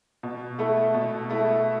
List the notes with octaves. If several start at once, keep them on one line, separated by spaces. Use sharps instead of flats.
B2
A3 E4 A4
B2
A3 E4 A4